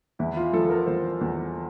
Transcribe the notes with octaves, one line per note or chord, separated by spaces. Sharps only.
E2 E4
F4
F3 A4
A#4
E2 C5
E2